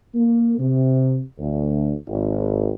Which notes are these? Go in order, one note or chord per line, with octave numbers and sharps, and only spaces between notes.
A#3
C3
D2
G#1